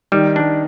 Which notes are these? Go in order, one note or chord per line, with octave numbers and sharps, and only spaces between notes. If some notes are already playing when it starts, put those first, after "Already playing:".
D#3 G3
D4